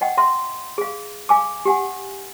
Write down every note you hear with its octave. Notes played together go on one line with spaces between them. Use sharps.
D#5 F#5 G5
E5 C6
G#4 F5
F5 G#5 D6
G4 F#5 G#5